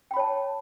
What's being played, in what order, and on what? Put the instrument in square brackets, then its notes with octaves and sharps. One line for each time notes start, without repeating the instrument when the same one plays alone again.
[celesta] G5
B5
C#5
A5